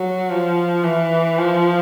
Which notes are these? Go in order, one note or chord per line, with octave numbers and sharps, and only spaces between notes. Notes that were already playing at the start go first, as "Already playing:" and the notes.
Already playing: F#3
F3
E3
F3